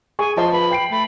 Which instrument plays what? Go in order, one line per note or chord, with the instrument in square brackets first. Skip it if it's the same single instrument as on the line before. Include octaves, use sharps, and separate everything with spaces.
[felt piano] G#4 C#6 [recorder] G#5
[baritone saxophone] F3 [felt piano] C5 D#5 A5 [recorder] C6
[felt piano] B4 [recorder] B5
[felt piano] G5 C7 D7
[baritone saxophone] A3 [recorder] B5